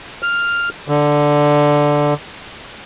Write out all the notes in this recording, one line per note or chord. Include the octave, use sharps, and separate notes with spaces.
F6
D3